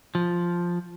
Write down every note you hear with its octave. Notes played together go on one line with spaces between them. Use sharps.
F3